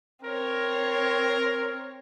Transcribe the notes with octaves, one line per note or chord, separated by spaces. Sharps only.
C4 A#4 C#5